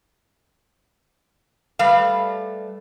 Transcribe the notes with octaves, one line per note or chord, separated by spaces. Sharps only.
G3 A3 B4 F5